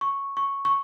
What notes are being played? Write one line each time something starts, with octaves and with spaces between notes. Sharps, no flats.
C#6
C#6
C#6